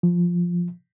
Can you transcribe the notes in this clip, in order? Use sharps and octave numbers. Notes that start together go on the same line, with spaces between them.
F3